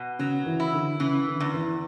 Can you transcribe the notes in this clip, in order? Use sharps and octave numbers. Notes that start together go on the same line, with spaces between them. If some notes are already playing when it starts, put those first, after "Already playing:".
Already playing: B2
C#3 F#3
E3
E4
D3
C#3 E3
D3
E2
E3